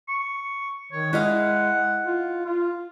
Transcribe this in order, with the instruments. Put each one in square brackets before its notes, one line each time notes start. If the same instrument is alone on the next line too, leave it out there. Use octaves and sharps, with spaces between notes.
[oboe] C#6
[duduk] D#3 [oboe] C#5
[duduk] G#3 [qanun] E4 D#5 F5 [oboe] F#5
[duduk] F4
F4